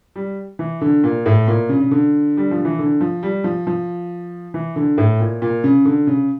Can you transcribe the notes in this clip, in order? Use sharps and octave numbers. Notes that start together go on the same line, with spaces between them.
G3
E3
D3
A#2
A2
A#2
C#3
C#3
D3
G3
F3
E3
D3
F3
G3
F3
F3
E3
D3
A2
A#2
A#2
C#3
D3
C#3